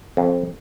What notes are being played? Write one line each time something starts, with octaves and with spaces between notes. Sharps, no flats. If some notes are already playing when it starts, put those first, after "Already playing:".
F2